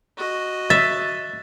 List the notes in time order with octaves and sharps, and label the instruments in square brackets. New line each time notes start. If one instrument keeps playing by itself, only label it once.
[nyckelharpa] F#4 D#5
[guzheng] E5 [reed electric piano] A6